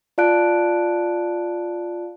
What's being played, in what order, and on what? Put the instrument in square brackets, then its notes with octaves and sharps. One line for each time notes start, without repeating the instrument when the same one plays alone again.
[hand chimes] F4 D5 F5 A5 F#6 D7